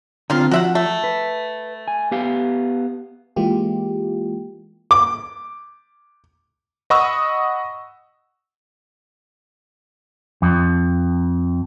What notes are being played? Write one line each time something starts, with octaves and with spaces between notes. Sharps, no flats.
D3 D#3 C4 F4
F3 F#4 E5 F#5
A3
B4
G#5
B3 G4 F5
E3 G#3 A#3 F4 G4
D6
D#5 F#5 B5 C#6 D#6 E6
F2